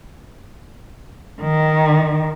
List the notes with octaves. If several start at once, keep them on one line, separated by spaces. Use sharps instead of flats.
D#3